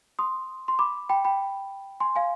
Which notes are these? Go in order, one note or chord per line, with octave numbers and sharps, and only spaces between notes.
C6 D#6
C6
B5 D6
G5 B5
G5 B5
G#5 C6
F5 G#5